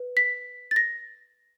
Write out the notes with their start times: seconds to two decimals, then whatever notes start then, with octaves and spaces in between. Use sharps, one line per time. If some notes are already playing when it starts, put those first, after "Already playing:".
Already playing: B4
0.17 B6
0.71 A6
0.76 A#6